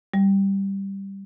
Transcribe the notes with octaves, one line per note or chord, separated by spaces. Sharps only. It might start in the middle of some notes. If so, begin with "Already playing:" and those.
G3